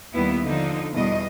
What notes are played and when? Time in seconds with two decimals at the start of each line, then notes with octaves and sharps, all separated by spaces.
0.13 D#2 G3 B3 E4
0.42 D3 F3 D#4
0.94 E2 B2 G3 D#5